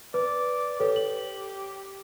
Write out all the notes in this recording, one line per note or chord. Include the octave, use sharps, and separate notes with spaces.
B4 D5
G4 A4 B4 C#5
F#7